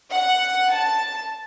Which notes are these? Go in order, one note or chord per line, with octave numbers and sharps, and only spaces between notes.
F#5
A5